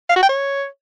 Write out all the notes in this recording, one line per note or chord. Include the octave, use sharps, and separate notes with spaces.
F5
F#4
G5
C#5